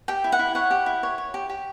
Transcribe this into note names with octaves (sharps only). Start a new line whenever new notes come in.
G4 G5
E4
F#5
E4
C#5 F#5
G4
E4
C#5
C#5
G4
G4